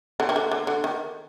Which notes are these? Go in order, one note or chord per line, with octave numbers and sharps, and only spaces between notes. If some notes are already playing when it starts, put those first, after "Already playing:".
D3
D#3
D3
D3
D3
D#3